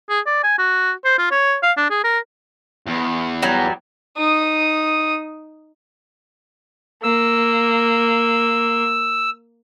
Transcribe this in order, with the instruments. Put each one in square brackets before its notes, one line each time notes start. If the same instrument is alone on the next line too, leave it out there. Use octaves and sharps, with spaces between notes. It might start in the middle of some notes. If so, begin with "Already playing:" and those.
[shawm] G#4
D5
G#5
F#4
C5
F4
C#5
F5
D4
G#4
A#4
[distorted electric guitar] E2
[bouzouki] F#3 G3
[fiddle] D#4 D#6
[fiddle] A#3 [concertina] E6